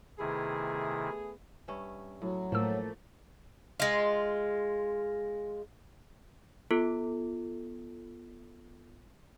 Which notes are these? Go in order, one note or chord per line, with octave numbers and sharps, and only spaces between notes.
C3 D#3 A3 B3 E4 G#4
G2 C#4 E5
A2 F#3
A2 F3 A3 A#3 E6
G#3 F4
B3 F4 A4